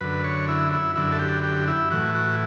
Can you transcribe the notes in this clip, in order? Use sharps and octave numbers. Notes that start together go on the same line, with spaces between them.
F#2 D3 B4
C#5
E4
E4
F#2 D3 E4
A4
G4
G4
E4
A2 E3 F#4
F#4